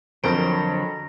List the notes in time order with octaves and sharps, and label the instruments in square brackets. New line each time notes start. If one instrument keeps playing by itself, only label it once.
[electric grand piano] F2 D7 [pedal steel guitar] D3 F#3 [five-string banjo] A#4 C5 [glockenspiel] A#5 A#6